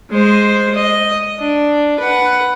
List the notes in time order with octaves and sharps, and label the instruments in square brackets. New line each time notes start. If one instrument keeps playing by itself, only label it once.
[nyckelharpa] G#3 C5
D#5
D4
B4 F#5